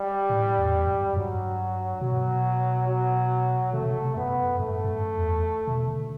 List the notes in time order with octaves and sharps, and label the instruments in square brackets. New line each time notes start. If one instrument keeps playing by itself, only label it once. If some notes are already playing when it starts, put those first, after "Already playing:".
Already playing: [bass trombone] G3
[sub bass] A2
E2
F#2
[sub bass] G2 [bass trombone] F#3
[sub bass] B2 [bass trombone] F#3
[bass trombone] F#3
[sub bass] C3 [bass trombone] A3
[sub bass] B2
C3
[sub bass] F#2 [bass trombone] B3
[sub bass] G2 [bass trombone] A3
[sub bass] G2
F#2
E2
B2
D3